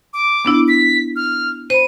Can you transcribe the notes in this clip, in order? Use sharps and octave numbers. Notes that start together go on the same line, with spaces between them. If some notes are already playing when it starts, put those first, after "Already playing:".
D6
B3 D4 E4
B6
F6
C5 B5 D#7